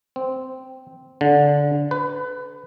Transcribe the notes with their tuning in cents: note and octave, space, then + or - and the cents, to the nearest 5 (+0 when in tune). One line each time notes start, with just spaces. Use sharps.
C4 -5
D3 -15
B4 +25